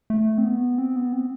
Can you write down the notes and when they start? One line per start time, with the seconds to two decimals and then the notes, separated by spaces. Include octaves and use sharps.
0.10 A3
0.38 C4
0.44 B3
0.78 C4
0.96 B3
1.12 C4